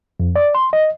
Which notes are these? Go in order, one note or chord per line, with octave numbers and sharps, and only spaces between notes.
F2
D5
C6
D#5